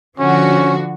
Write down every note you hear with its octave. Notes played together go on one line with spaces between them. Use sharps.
D3 F3 C#4 F#4